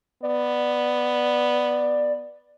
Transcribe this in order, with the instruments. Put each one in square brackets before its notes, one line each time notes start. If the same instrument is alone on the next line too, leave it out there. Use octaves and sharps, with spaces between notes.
[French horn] B3 [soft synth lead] D5